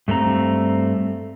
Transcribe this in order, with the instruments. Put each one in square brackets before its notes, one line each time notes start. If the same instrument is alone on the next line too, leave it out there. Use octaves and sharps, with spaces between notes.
[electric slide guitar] G2 A3 C4 A#5